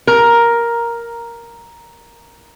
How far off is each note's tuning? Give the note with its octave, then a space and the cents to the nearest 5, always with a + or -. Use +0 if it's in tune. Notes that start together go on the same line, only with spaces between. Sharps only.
A#4 +5